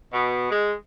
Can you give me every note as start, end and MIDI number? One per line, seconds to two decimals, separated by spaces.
0.12 0.50 47
0.51 0.73 56